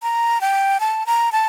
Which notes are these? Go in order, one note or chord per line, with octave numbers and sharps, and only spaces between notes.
A#5
G5
A5
A#5
A5